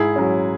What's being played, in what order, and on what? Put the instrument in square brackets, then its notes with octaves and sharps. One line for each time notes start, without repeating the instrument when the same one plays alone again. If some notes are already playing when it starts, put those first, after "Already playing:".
Already playing: [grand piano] G#2 [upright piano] E4 G#4
[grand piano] F#3 C#4